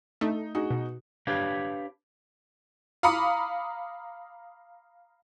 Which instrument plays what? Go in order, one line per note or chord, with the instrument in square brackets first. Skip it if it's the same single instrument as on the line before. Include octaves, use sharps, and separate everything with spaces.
[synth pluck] A3 [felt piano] D#4
[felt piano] D#4 F#4 G#4
[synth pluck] B2
[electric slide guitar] D4 G4 B4 C#5 F5
[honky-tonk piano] F5 A#5 B5 D6 D#6 C#7